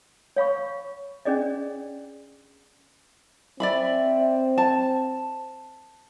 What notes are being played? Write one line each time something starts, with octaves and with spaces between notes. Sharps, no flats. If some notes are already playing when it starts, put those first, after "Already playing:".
C#5 F5 B5 C#6
C#4 D4 G#4 D5 D#5
C4 D5 E5 B5
A5